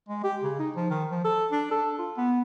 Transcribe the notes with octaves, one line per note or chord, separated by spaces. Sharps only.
G#3
G4
C#3
D#4
F3
D#3
F3
A4
D4
A4
F4
B3